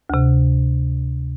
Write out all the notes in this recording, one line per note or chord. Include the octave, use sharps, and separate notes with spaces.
D2 C3